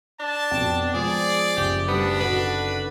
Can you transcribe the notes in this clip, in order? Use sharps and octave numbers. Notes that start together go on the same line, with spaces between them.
D4 A5
F2 B2 G5
F3 G#3 G#4 D5
F#1 G4
D2 G3 B3 D4
D3 D#4 F#4 B4